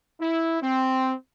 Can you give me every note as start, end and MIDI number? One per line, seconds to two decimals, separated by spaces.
0.21 0.60 64
0.62 1.14 60